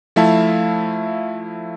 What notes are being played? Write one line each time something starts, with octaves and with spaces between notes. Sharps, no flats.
F3 A3 E4 E5 F5 A5